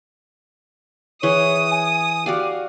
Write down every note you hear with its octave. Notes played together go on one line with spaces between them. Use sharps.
E3 G#4 C#5 D#6
G#5
F#4 G4 D5 F5